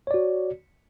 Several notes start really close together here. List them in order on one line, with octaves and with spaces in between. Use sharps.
C#5 D5 F#4